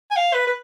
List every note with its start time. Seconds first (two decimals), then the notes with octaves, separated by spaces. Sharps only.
0.11 G#5
0.16 F5
0.34 B4
0.47 B4